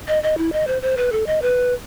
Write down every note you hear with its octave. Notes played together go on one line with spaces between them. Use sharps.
D#5
D#5
E4
D#5
C5
C5
B4
A4
D#5
B4